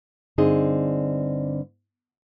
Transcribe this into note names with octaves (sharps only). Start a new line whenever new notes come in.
G2 D3 C4 D#4 G#4 D#5